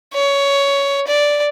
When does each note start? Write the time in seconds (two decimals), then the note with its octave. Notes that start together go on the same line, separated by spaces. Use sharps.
0.14 C#5
1.07 D5